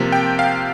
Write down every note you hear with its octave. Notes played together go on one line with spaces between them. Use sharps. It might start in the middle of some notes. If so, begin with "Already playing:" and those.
Already playing: C3 F3 A#3
G5
F5